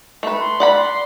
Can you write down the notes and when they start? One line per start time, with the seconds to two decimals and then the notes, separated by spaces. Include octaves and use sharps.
0.23 A3 B4
0.40 C6
0.60 D5 F#5 B5
0.77 C6